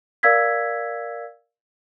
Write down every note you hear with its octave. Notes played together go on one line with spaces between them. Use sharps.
A#4 D5 F5 E6 G#6 B6